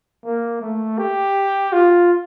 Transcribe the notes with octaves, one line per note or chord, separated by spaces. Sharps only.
A#3
A3
G4
F4